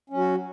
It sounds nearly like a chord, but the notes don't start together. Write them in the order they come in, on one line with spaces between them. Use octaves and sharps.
C#4 F#3 F#4